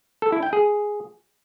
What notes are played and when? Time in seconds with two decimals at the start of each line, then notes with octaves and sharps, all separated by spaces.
0.22 A4
0.32 E4
0.43 G5
0.53 G#4